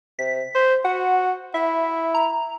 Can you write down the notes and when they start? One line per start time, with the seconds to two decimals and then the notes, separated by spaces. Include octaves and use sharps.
0.19 C3 B6
0.55 C5
0.85 F#4 F#5
1.54 E4 E5
2.15 A#5